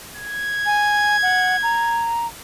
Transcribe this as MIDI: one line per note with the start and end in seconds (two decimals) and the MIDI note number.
0.16 2.11 92
0.66 1.17 80
1.22 1.57 78
1.63 2.27 82